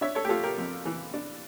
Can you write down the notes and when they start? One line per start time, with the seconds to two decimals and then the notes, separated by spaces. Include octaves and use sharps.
0.01 D4 C#5 E5
0.15 A4 C#5
0.25 G4
0.29 A3 F4 A4
0.43 G4 A#4
0.58 F2
0.85 E3
1.14 D4